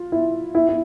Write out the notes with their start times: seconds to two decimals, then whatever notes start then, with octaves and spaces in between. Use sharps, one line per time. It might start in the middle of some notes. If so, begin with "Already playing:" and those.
Already playing: F4
0.12 E4
0.55 E4
0.69 E4